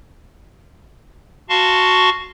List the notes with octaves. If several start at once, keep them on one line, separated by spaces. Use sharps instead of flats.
F#4 F5 A5 C6 C#6